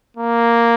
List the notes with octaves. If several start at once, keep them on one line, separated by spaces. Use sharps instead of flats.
A#3